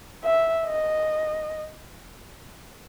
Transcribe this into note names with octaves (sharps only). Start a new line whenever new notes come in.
E5
D#5